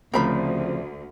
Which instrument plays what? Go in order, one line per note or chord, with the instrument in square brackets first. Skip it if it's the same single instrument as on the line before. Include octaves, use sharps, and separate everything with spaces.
[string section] D2 [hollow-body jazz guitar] C#3 F3 C4 [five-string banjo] A#4 B5